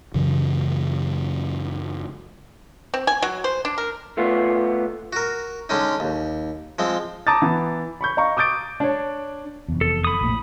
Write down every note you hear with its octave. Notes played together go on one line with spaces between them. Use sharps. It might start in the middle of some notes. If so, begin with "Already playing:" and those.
F#2 C#3 E3 F#3
C4
G#5
F#3
C5
D4
A#4
A3 B3 F4
F#4 A#4
D3 G#3 C#4 D#4
D#2
F3 G#3 C4
A5 A#5 D6 D#6 G6 A6
E3 B3
B5 C#6 G6
D#5 F5 A#5 C#6
D6 D#6 G6 A6 D7
D4 C#5
F1 E2
A4
B5 D#6
A#1 A2 A#3